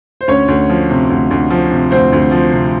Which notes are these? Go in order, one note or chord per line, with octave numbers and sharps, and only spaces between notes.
C5
D2 C#4 C#5
D2
F3
C3
D2
D2
F3
C3
D2 C4 C5
D2
F3
C3